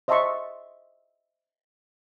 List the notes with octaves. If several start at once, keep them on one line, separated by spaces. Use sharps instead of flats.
C5 D#5 E5 A5 C6 C#6